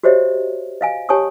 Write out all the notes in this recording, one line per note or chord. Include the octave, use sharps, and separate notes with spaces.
F#4 G4 C5 C#5 D#5 E5
D#5 F5 G#5
G4 C#5 G#5 A5 C#6 D#6